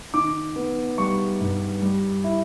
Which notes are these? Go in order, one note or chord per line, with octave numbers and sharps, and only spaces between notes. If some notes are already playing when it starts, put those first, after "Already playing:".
D#3 D6
B3
G3 C#6
G2
G3
E4